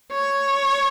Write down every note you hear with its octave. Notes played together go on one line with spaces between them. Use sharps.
C#5